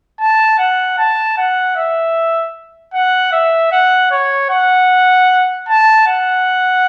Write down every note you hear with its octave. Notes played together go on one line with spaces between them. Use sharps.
A5
F#5
A5
F#5
E5
F#5
E5
F#5
C#5
F#5
A5
F#5